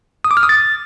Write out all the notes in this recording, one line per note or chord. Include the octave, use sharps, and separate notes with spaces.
D#6
D6
F6
D#6
A6